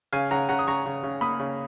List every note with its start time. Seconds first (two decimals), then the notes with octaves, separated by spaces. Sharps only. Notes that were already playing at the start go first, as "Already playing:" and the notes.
0.13 C#3 F5 G#5
0.31 C#3 F#5 A#5
0.49 C#3 F#5 A#5
0.59 D#6
0.68 C#3 A#5 C#6
0.86 C#3
1.03 C#3
1.21 A#3 B5 D#6
1.40 C#3